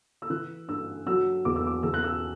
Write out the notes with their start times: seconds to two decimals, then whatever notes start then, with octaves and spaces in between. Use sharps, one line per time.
0.22 E6
0.30 E3 F#6
0.68 G2 E6
1.06 F#3 E6
1.45 E2 D6
1.56 E6
1.67 D6
1.83 E2 E6
1.94 F#6
2.04 E6